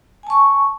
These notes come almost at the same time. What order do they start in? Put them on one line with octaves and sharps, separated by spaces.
G#5 A5 C#6